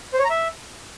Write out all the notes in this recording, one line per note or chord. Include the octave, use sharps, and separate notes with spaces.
C5
C#5
A#5
E5